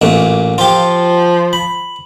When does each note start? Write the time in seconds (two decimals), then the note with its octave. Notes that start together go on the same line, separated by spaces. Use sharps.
0.02 A1 A#2 A3
0.58 F3 F4 G4
1.53 B5